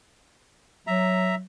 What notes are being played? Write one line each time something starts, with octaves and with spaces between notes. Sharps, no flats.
F#3 E5 A#5